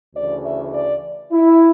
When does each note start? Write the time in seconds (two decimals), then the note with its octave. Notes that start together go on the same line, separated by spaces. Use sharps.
0.14 D2 C#3 E3 D5
0.43 E5
0.74 D5
1.31 E4